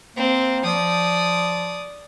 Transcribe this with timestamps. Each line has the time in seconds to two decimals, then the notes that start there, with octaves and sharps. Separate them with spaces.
0.16 A#3 C4
0.64 F3 D5 D#6